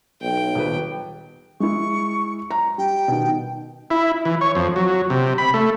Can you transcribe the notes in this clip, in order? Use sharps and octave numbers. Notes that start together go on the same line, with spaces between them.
B1 G5
D#1 B4
G#3 E4 C#6
A#5
G3 G5
B2 D#3
E4
E3
C#5
F2
F#3
C3
B5
A3